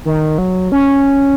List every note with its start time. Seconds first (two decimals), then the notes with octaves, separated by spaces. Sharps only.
0.05 D#3
0.38 F#3
0.72 C#4